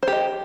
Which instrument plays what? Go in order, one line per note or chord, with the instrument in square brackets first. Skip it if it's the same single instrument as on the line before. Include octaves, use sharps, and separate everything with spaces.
[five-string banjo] C5
G4
D#5